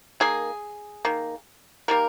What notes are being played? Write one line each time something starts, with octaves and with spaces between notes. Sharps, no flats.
D#3 A#3 G#4
D#3 A#3
D#3 G3 A#3 A#4